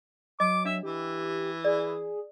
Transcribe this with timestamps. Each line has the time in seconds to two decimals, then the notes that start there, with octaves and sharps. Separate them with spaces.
0.40 F#3 D#5 D6
0.65 D4 E5
0.83 E3 G4
1.65 G#4 D5